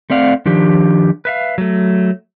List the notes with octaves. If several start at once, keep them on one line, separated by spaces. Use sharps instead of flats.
A3 C4 D5 F5 F#5
D#3 F3 D4 G4
B4 E5 F5
F#3 A3